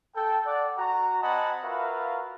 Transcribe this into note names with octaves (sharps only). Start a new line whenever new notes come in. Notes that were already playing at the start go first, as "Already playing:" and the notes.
A4 G5
D5 F#5
F#4 A#5
C4 D#5 F#5 G#5 A5 B5
F4 F#4 A#4 B4 E5 F5